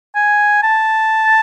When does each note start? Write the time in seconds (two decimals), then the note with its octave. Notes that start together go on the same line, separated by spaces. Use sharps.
0.16 G#5
0.63 A5